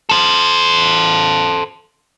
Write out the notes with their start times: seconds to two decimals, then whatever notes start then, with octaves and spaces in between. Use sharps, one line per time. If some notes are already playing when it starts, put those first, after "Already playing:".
0.09 A4 C5